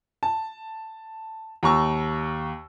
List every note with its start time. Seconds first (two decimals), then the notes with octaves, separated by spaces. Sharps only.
0.23 A5
1.63 D#2 A#5 C#6 E6